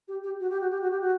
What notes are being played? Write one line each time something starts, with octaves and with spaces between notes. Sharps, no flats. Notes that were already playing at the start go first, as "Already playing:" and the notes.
G4
G4
F#4
G4
F#4
G4
F#4
G4
F#4